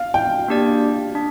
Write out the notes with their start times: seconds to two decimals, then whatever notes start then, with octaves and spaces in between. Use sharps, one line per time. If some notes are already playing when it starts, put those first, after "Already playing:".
Already playing: F5
0.14 G5
0.48 A#3 D4 G4 D5
1.15 D4